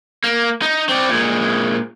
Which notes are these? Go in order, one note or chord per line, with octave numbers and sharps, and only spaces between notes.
A#3
D#4
C4 D5
A#2 G#3